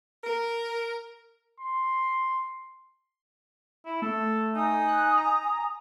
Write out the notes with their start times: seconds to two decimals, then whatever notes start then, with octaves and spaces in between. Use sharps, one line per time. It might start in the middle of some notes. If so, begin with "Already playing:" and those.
0.24 A#4
1.60 C6
3.86 E4
4.02 A3 A4
4.54 D#4 G#5 D#6
4.88 F#6
5.17 A#5